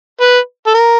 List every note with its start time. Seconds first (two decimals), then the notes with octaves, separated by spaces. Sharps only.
0.21 B4
0.67 A4
0.74 A#4